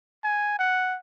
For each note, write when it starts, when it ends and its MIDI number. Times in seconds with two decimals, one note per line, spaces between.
0.24 0.59 80
0.59 0.97 78